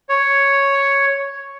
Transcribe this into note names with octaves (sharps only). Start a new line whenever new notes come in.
C#5